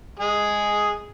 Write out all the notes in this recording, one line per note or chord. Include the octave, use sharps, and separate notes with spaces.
G#3 G#4